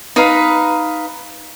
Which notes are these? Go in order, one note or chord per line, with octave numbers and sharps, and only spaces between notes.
D#4 B4 F5